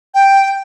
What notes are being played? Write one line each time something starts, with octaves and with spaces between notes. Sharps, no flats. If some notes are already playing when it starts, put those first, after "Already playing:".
G5